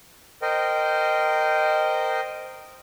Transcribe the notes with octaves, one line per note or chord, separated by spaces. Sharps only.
A#4 C5 D#5 G5